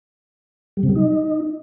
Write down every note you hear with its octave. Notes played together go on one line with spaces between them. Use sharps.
G3
C3
G3
D#4